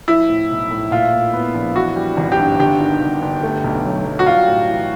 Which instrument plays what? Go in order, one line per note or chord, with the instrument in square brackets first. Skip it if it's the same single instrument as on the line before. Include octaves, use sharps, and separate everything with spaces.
[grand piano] F3 [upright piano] E4
[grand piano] A2
B1
A2
[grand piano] A#2 [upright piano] F4
[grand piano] A#2
B3
A#1
[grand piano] E3 [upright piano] F#4
[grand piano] G3
G#1
[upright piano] G4
[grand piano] G2
[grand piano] G1 [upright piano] G4
[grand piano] D#3
G1
G1
A3
B1
F#3
F#3
[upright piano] F#4
[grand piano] G3 [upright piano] F4
[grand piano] A2
E3